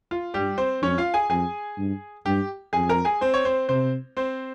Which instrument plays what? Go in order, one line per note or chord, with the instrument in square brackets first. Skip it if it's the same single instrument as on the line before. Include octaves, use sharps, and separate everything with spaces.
[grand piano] F4
[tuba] G2 [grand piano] G3 G4
[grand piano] C4 C5
[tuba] F2 [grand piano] C#4 C#5
[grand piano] F4 F5
G#4 G#5
[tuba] F2 [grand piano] G#4 G#5
[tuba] G2
[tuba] G2 [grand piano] G4 G5
[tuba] F2 [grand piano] G#4 G#5
[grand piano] A#4 A#5
G#4 G#5
C4 C5
C#5
C4 C5
[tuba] C3 [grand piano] C4 C5
[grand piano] C4 C5